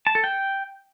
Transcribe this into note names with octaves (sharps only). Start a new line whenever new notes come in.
A5
A4
G5